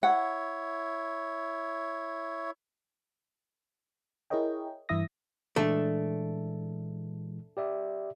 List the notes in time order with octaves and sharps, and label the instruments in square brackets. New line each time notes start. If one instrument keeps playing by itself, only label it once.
[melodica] E4 C#5 [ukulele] F#5
[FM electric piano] E4 G#4 A#4 C#5 D#5 G5
G2 E3 E4 E5 D#6 A#6
[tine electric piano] A#2 E3 G#3 [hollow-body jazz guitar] A3 D4
[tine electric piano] G4 D5 E5